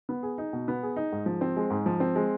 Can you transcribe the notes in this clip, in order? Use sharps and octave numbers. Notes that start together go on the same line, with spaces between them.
B3
G#4
D#4
B2
B3
G#4
D#4
G#2
F3
C4
G#3
G#2
F3
C4
G#3